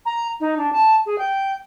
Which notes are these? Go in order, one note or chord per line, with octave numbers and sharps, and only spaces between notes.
A#5
D#4
D4
A5
G#4
G5